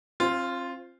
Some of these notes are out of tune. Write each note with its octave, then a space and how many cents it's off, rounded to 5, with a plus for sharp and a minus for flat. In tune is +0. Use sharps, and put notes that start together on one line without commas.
C4 +35 F4 -5 C5 +0